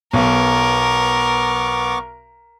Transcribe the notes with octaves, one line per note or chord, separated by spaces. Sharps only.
B1 B3 A#4 C#6 D6